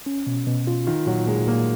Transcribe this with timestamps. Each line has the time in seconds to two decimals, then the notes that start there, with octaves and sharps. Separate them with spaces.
0.06 C#4
0.27 B2
0.47 B2
0.67 F4
0.87 D#3 F4
1.06 A#2 F#3
1.27 A#2 G#3
1.47 A#2 A#3